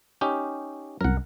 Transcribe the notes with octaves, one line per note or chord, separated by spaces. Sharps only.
C#4 D#4 G4
C2 F#2 A#4 F#5